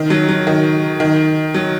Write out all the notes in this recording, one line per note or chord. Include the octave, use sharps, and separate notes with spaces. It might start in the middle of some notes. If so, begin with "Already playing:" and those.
Already playing: D#3
F#3
F#3
D#3
D#3
F#3